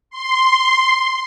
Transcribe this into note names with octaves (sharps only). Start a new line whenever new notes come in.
C6